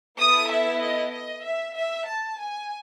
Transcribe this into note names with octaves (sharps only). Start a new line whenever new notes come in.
B3 E4 A4 D#6
E5
D#5
D#5
E5
E5
A5
G#5